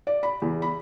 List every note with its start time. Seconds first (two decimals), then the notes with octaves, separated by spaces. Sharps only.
0.07 D5
0.23 B5
0.42 E2
0.62 B5